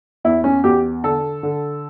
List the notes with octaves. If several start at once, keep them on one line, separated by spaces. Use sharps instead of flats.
E2 E4
C#4
E2 G4
D3 A4
D3